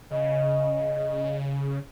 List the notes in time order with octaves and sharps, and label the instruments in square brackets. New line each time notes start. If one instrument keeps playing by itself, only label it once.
[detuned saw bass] C#3 [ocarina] D#5